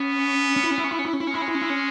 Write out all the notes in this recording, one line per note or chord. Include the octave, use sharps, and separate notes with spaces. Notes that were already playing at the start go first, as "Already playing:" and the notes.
Already playing: B3 C#4
C#4
E4
C#4
E4
C#4
E4
C#4
E4
C#4
E4
C#4
G#3 E4
C#4
E4
C#4
E4
C#4